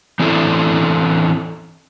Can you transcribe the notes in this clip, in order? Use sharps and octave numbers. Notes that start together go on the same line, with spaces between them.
E3 C4 D4 E4 A4